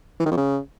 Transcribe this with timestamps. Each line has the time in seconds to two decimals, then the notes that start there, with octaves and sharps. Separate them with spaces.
0.20 E3
0.25 D#3
0.31 F2
0.37 C#3